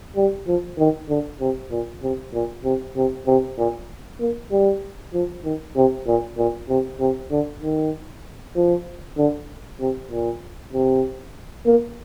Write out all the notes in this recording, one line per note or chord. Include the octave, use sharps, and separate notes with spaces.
G3
F3
D#3
D3
C3
A#2
C3
A#2
C3
C3
C3
A#2
A#3
G3
F3
D#3
C3
A#2
A#2
C3
C3
D3
D#3
F3
D3
C3
A#2
C3
A#3